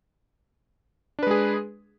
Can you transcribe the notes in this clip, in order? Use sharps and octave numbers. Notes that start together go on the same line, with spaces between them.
G#3 D4 G#4 B4